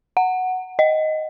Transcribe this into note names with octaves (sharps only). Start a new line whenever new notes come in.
F#5
D#5